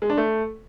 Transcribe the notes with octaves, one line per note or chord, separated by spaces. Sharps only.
G#3
D4
A3